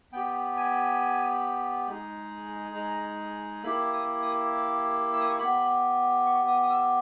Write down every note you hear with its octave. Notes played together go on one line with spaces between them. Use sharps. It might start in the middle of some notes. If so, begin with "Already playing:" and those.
B3 G4 G5
G#5
G#3 D#4 G#4
A#5
A#3 E4 G4 B5
D#6
D#6
E6
D#6
C#6
B3 G4 B5
C#6
D#6
D#6
E6